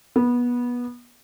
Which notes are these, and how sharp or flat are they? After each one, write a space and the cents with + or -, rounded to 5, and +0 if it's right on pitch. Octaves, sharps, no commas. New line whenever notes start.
B3 -20